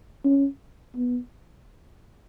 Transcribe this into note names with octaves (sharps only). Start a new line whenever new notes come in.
C#4
B3